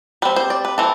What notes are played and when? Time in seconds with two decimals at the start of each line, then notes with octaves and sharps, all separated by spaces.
0.22 G3 C4 B4
0.36 C5
0.50 D5
0.65 B4
0.78 E3 C4 A4